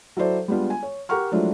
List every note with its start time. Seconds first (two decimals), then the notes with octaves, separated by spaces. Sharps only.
0.17 F#3 E4 A4 C5 D5
0.48 G3 G#3 B3 D4 F4
0.70 G#5
0.83 C#5
1.09 G4 A#4 F#5 A#5 C#6 F6
1.32 F3 F#3 G#3 A3 D4 E4